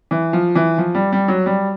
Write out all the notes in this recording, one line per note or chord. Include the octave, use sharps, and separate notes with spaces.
E3
F3
E3
F3
G3
G3
F#3
G3